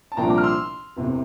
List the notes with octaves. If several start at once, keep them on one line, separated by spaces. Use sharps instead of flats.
A5
C2 A#2 F3 A#3 D4 G5 A#5
A#5 D6
F6
C6 E6
E1 E2 C3